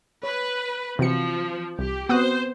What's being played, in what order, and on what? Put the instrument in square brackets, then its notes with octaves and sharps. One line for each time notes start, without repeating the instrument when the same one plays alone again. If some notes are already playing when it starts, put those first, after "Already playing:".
[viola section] B4 [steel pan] C#5
[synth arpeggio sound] C3 C#7 [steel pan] E3 C4 F#4 [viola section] F3
[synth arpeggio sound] C2 [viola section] G4
[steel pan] B3 C4 [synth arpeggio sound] F#4 D#6 F#6 [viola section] C5